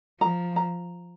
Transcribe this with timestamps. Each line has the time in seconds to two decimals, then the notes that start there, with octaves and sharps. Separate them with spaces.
0.20 F3 A#5
0.56 A#5